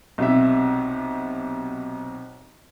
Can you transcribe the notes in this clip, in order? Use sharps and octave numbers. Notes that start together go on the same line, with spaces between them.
B1 C3 E5